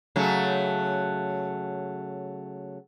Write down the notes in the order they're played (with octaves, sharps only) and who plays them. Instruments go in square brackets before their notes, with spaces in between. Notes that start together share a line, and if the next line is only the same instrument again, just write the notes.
[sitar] C#3 F#3 A3